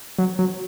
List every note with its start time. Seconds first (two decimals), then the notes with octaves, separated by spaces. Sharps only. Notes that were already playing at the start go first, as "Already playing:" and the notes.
0.18 F#3
0.39 F#3